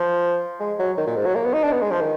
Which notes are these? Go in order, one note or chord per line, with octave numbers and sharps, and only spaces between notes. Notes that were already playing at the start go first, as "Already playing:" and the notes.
Already playing: F3
G#3
F#3
D#3
A#2
G#2
F#3
A#3
B3
D#4
D4
B3
G#3
F3
D#3